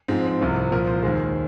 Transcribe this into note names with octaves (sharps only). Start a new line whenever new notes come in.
G#2 F3 G#3 C4
C4
C2 C3 F3
C2 A#2 F3 A#4
C5
D#2 D#3 G#3 C5